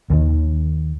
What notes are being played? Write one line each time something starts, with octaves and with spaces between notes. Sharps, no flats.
D#2 D#3